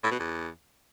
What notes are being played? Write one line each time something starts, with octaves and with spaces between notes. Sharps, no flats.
A2
B2
E2